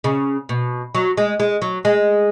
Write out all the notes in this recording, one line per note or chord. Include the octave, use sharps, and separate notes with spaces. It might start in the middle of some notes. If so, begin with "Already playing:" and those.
C#3
B2
F#3
G#3
G#3
F#3
G#3